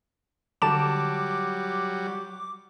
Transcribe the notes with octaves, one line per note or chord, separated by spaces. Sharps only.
D3 F#3 G3 A5 D6 E7